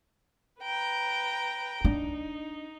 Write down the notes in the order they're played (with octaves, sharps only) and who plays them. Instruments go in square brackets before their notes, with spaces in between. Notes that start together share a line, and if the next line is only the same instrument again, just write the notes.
[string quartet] B4 G5 A#5
[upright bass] D4 [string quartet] D#4